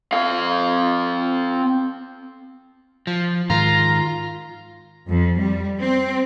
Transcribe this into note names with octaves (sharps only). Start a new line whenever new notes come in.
C4 F5
F3
G#2 D#3 F4 A#5
F2
G3
C4